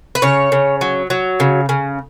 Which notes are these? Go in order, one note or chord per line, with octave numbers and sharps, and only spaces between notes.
B4
C#3 C#5
C#3
F#3
F#3
C#3
C#3